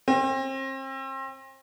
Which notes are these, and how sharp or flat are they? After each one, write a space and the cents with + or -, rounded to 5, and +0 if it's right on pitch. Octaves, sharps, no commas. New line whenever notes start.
C4 +35